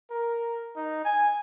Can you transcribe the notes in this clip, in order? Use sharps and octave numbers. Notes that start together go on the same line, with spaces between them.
A#4
D#4
G#5